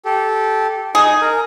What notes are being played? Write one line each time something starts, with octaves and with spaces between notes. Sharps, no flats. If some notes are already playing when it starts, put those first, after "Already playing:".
G4 A4
D#4 G#4
A#4